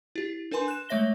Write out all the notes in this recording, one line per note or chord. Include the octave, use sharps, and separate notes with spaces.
E4 G4
D4 A#4 B4 G#5 C6
F#6 E7
G#3 A3 C#5 E5 A#6 G7